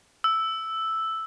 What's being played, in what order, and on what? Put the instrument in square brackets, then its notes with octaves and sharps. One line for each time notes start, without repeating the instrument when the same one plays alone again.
[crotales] E6